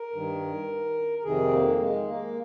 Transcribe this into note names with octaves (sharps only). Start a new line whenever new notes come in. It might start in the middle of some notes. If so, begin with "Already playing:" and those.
Already playing: A#4
G2 D#3
A#4
F2 C3 D#3 G#4
A#3
G#3
A#3